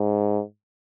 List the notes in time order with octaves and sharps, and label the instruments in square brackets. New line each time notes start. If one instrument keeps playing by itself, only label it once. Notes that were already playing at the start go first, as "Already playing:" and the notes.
Already playing: [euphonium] G#2